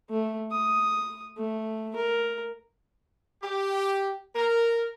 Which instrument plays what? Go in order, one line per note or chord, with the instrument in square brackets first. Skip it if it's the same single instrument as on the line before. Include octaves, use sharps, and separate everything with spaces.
[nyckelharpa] A3
D#6
A3
A#4
[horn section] G4
A#4